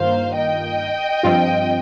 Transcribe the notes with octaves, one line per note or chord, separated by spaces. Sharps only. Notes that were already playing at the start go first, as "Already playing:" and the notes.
Already playing: G2 D#3 A#3 F4 A#4 C5 F5
D#5 G5
G2 F3 C4 F4